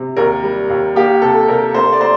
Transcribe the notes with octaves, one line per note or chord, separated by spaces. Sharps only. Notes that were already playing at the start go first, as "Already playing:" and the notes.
Already playing: C3
D#2 A#4
G3
D#2
A#3 G4
C3 A4
C3 A#4
A3 C5
D5
A3 C5